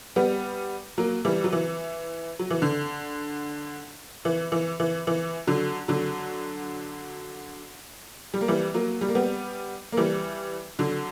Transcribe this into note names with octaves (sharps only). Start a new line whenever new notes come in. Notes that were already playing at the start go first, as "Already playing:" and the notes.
G3 B3
F#3 A#3
E3 G3
F#3
E3
F#3
E3
D3
E3
E3
E3
E3
D3 F#3
D3 F#3
G3
A#3
E3 G3
F#3 A#3
G3
A#3
G3 B3
A#3
E3 G3
D3 F#3